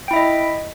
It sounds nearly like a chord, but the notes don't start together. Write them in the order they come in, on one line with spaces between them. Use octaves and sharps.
G5 E4 E5 D#5